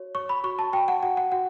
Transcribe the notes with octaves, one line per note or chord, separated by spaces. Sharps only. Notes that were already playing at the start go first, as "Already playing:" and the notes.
Already playing: F#4 C#5
C#5 C#6
B5
F#4 C#6
A5
F#4 G5
F#5
F#4 F#5
F#5
F#4 F#5